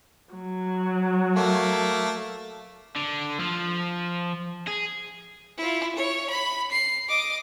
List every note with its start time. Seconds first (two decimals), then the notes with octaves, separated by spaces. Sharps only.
0.33 F#3
1.36 A3 A#3
2.96 D3
3.40 F3
4.67 G#4
5.58 E4 F4
5.96 C#5
6.30 B5
6.71 C7
7.09 D#5 D6